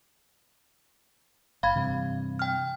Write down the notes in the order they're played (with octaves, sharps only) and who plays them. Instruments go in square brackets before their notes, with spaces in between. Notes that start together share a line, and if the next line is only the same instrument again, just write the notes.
[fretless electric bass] F#1 [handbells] F5 B5 G#6
[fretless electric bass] G2 C3 E3
[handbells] G5 F6